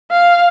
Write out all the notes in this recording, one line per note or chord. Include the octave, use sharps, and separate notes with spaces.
F5